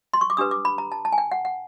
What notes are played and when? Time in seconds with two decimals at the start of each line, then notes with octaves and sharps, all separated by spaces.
0.14 C6
0.21 C#6
0.30 D6
0.37 D4 G4 B4 D#6
0.51 D6
0.65 B5
0.78 A#5
0.92 A5
1.05 A5
1.13 G#5
1.18 G5
1.32 F#5
1.45 F#5